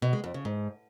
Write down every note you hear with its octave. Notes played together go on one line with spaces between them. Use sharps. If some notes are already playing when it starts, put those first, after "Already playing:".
B2
G#3
F2
C#3
G#2